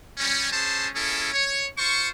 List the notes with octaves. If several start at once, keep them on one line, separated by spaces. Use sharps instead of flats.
G3 C#4
A3 C#4 G#4 C5 A5
A#3 C#4 E4 G#4 A4
C#5
F4 C5 C#6